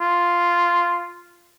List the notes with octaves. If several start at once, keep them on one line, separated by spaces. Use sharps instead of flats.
F4